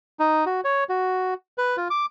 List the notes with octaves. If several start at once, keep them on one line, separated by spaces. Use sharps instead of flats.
D#4
F#4
C#5
F#4
B4
F4
D6